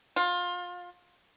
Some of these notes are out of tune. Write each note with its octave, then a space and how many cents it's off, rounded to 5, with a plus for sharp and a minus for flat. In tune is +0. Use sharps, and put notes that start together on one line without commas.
F4 +25